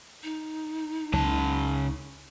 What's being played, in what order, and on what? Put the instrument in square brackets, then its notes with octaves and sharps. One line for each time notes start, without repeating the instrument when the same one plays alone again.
[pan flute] D#4
[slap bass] C#2 F#3 [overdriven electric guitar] C#3 A5